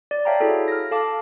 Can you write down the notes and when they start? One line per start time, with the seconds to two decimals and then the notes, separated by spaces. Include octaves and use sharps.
0.11 D5
0.25 C#5 E5 F5 G5 A5 A#5
0.41 E4 F#4 G#4 A4
0.68 F6 A#6
0.91 A4 F5 A5 D6